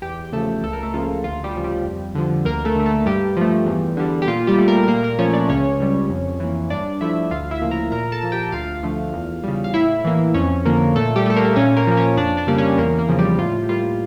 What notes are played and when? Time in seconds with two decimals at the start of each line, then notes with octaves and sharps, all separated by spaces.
0.02 E2 G4 G5
0.33 C#3 F3 A3 A4
0.63 C#2 A4
0.73 A#4
0.83 A3 A4
0.94 C#3 F3 A#3 F4
1.24 D2 F4
1.44 G3 G4
1.55 C#3 F3
1.64 G3 G4
1.84 F2
2.15 D3 F3
2.45 D2 A#3 A#4
2.65 A3 A4
2.75 D3 A3
2.86 A3 A4
3.06 G2 G3 G4
3.37 F3 A3
3.66 E2
3.97 D3 G3
4.22 G4
4.28 A#2 F4
4.47 G3 G4
4.58 A3
4.68 A#3 A#4
4.88 A#2 A#3 A#4
5.03 A#3 A#4
5.19 F3 A3 C#4 C#5
5.33 D4 D5
5.49 C#2 C#4 C#5
5.80 C#3 G3
6.09 F2
6.40 E3 A#3
6.70 G2 D4 D5
7.01 F3 A3 E4 E5
7.31 D2 F4 F5
7.51 E4 E5
7.62 C#3 F3 A#3
7.71 A#4 A#5
7.92 A#2 A#4 A#5
8.12 A4 A5
8.23 F3 A#3
8.32 G4 G5
8.52 D2 F4 F5
8.83 D3 F3 A3
9.14 E2
9.43 C#3 G3
9.64 F5
9.74 A2 E4 E5
10.05 E3 A#3
10.34 F2 C#4 C#5
10.65 D3 F3 A#3 A#4
10.95 A#2 A3 A4
11.16 G3 G4
11.26 A3 A4
11.36 A#3 A#4
11.56 A#2 C#4 C#5
11.77 A#3 A#4
11.87 F3 A#3
11.97 C#4 C#5
12.17 F2 D4 D5
12.37 D4 D5
12.47 C#3 G3 A#3 D5
12.58 C#4 C#5
12.78 E2 A#3 A#4
12.99 A#3 A#4
13.09 C#3 F3 A#3
13.19 G3 G4
13.39 A2 F4
13.64 G4
13.69 G3 A#3 F4